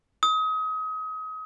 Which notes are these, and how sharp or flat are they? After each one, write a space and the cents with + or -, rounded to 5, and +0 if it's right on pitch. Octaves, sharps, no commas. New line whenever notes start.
D#6 +30